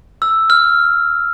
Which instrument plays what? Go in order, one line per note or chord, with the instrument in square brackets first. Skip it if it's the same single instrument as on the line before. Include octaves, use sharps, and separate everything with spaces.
[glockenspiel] E6
F6